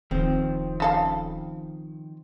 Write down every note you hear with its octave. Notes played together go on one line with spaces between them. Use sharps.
D#1 D#3 F3 C4
C#3 A4 F5